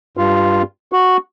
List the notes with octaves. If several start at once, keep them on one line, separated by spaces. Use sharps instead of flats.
G2 F4
F#4